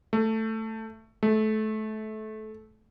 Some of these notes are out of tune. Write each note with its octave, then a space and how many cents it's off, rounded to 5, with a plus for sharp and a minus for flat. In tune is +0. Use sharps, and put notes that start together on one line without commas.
A3 +10
A3 -25